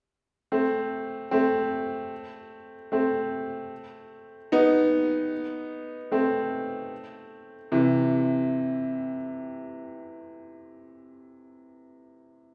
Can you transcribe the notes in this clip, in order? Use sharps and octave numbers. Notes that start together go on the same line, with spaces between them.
A3 C4
A3 C4
A3 C4
B3 D#4
A3 C4
C3 E3